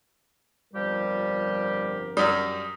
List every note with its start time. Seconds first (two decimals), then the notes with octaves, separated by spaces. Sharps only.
0.74 G1 F2 F3 G3 G4 A#4
2.17 F#2 G3 D#6